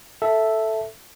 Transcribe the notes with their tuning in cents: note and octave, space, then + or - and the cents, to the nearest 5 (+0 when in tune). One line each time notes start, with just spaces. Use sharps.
A4 +0 E5 +0